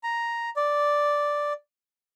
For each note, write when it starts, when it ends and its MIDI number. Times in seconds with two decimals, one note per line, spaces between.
0.03 0.49 82
0.56 1.53 74